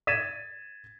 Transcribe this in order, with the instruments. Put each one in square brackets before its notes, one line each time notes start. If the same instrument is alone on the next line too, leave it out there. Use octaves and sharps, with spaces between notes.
[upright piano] G#6 A6 B6 D#7 E7